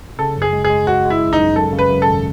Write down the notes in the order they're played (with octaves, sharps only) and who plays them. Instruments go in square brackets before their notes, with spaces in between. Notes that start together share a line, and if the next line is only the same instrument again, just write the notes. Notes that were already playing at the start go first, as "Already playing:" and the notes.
[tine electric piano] C#3 [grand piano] A4
[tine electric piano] F#2
[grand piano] G#4
[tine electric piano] G#3
[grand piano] G#4
[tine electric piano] G#3
[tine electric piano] G#3 [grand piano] F#4
[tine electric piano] G#3
[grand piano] E4
[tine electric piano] G#1
[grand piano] D#4
[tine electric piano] F#2
[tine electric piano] F#2 [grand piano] A4
[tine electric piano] C#3
[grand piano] B4
[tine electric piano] F#2
[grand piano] A4
[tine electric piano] G#1